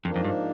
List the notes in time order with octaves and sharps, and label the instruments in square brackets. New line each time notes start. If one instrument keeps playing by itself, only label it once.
[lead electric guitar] F2 [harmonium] G#2 F3 A#3 D4
[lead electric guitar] F2
G2